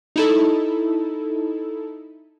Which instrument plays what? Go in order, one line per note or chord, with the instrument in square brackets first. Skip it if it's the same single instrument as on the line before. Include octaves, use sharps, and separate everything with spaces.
[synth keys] D#4 E4 A4